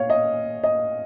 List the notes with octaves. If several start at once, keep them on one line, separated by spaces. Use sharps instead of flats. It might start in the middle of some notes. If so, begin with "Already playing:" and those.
Already playing: A#2 C#5 F5
D#5
D#5